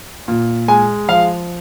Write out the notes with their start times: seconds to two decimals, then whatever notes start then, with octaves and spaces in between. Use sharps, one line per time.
0.28 A#2
0.68 G#3 G#5
1.09 F3 F5